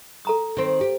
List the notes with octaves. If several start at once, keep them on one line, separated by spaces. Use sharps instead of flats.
A4 A#5 D#6
D#3 C4
G4